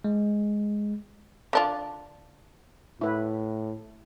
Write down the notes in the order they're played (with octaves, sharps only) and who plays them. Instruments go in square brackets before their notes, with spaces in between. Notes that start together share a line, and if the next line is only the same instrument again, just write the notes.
[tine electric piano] G#3
[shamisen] D3 D4 F4
[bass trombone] A2 [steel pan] E4 B4